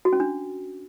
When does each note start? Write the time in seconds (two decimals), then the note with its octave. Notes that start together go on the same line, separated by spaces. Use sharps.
0.05 F#4
0.13 C#4
0.20 D4